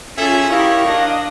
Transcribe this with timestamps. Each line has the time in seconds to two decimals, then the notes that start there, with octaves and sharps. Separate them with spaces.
0.18 C#4 F4 G#4 A4 E5
0.50 D#3 E4 G4 A#4 C#5 F5
0.86 D4 D#5